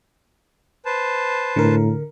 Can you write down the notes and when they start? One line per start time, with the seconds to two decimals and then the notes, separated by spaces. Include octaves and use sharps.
0.85 B4 C5 A5
1.56 A2 D3 A#4